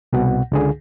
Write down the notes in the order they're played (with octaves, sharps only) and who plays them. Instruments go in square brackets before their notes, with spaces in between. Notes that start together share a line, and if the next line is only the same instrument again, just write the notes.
[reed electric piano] C2 B2 F#5
C#2 D3 G#4